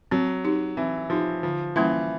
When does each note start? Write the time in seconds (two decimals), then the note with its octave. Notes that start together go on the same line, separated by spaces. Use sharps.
0.11 F#3 C4
0.45 D#4 G4
0.77 E3 C4
1.10 F3 D#4 G4
1.43 D3 F3
1.76 E3 G3 A#3 C#4 E4